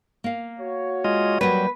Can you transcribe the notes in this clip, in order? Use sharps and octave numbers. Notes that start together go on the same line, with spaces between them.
A#3 F5
F#4 C#5
G#3 F4 D#5
F#3 G3 A#3 B4